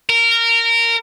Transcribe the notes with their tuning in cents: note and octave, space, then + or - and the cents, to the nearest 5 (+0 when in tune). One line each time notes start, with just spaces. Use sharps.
A#4 -15